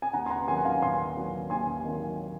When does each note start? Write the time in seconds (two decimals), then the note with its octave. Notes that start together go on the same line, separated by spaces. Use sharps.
0.02 G#5
0.13 D#2 F#5 A#5
0.26 C6
0.30 F#5 A#5
0.48 D#3 F#3 G#5 C6
0.57 F#5
0.65 F5 G#5
0.82 D#2 G#5 C6
1.17 D#3 F#3
1.50 D#2 G#5 C6
1.85 D#3 F#3